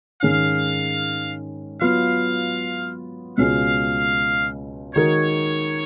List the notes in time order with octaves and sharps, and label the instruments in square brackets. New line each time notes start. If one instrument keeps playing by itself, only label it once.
[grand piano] G#2 D#3 G#3 C#4 [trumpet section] F5
[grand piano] F#3 B3 F4 [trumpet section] F5
[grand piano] C#2 B2 G#3 C#4 F4 [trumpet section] F5
[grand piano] D#3 G#3 D#4 F#4 A#4 [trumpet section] C#5